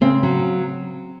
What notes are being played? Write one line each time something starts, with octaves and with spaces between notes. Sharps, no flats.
C#3 C4
F#3